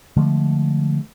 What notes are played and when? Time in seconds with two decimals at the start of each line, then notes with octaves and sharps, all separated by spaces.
0.17 D3 F3 G#3 A3